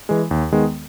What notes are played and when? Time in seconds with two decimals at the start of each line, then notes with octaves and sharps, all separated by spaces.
0.09 E3 G#3
0.31 D#2
0.52 D#3 G#3 B3